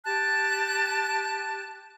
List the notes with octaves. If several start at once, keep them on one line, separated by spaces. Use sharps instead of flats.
G4 A5 F#6